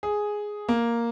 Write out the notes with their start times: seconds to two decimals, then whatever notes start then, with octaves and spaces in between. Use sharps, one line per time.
0.03 G#4
0.69 A#3